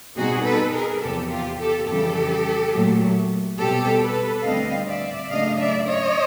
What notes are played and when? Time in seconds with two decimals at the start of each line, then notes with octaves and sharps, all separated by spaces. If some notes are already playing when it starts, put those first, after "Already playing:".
0.16 B2 G3 C4 D#4 F#4 G#4
0.45 A4 B4
0.73 G#4 A#4
1.02 E2 C3 F3 G4 A4
1.31 F4 G4
1.59 G4 A4
1.88 F2 C#3 E3 G3 G4 A4
2.73 A#2 F#3 A3
3.59 B2 G3 C4 G4 A4
4.02 A4 B4
4.44 D2 D3 G3 C4 D#5 F5
4.87 D5 E5
5.30 C#3 F#3 A3 D4 D#5 F5
5.58 D5 E5
5.87 C#5 D#5